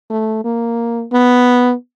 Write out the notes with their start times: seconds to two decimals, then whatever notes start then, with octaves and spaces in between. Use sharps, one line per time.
0.10 A3
0.44 A#3
1.12 B3